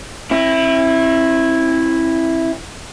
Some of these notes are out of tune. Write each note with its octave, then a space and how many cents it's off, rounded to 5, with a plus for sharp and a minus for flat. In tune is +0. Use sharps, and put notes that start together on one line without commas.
C4 +45 E4 +0